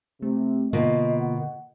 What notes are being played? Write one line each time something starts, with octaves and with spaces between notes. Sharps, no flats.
C3 A3
B2 D3 A#3 F4 D#5
D#5 F#5